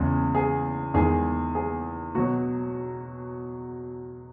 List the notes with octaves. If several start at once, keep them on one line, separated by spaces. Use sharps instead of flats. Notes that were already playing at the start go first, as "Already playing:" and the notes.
Already playing: E2 C#3 G#3
G#4
E2 D#3 G#3 G#4
G#4
B2 F#3 F#4